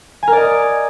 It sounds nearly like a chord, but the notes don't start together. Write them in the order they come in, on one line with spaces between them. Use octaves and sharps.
G#5 A#4 D5 D#5